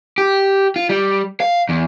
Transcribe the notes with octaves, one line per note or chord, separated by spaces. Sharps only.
G4
F4
G3
F5
E2